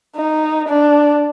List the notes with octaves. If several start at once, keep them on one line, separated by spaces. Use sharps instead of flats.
D#4
D4